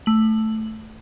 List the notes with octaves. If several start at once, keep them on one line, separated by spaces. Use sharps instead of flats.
A3 F#7